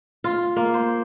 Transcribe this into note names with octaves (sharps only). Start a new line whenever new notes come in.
F4
A#3
C5